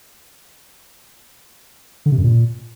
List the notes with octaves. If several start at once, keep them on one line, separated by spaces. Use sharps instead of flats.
D3
C3
F#2
A#2